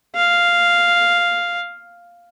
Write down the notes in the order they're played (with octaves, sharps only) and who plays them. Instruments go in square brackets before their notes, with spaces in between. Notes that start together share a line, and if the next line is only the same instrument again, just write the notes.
[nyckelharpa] F5